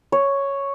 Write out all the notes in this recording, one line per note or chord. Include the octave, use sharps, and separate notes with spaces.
C#5